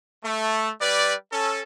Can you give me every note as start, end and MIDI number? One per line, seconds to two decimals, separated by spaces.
0.24 0.71 57
0.81 1.13 55
0.81 1.13 71
0.81 1.13 74
1.32 1.62 61
1.32 1.62 69